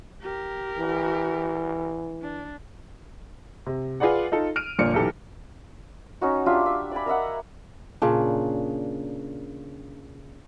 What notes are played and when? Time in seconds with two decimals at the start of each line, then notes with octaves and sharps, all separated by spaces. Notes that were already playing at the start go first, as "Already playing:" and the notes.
0.22 G4 A#4
0.79 E3
2.22 D4
3.67 C3
4.00 F4 G#4 B4 D5 F#5
4.32 D#4 F4 A4
4.56 F6 D7 D#7
4.79 G1 A#2 F3 D5 C#7
4.94 B1 E3 G4 A4
6.21 C#4 D#4 F#4
6.46 D4 F4 G4 E5
6.66 E5
6.91 D5 G#5 B5
7.06 A#4 D#5 E5 F#5
8.02 A#2 C#3 D4